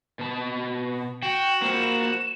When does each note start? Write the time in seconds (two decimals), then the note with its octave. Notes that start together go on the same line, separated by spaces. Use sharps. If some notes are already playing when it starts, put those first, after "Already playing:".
0.19 B2 A5
1.23 F#4 G5 E7
1.62 A#3 A#4 C5